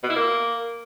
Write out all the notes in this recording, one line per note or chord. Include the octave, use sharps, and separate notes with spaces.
B2
E4
A#3